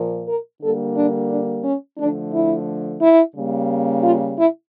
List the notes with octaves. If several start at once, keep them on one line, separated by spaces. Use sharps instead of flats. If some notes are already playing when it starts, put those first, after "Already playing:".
Already playing: A#2 F3 A#3
A#4
D3 G3 A#3 A4
D4
D4
C#4
D3 F3 A3 D4
E4
E4
C#3 G3 A#3
F4
E4